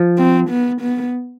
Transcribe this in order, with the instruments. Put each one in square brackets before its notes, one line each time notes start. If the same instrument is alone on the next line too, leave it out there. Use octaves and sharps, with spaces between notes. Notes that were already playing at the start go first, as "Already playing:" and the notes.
Already playing: [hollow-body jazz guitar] F3
[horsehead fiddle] C4
B3
B3